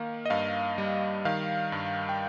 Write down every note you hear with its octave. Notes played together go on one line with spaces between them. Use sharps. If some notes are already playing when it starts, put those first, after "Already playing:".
Already playing: D#3 A#3 F5
D#5
G2 F5
G3
D#3 F5
G2
G5